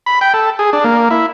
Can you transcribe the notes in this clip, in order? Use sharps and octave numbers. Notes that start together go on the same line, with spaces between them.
B5
G5
A4
G#4
D4
A#3
E4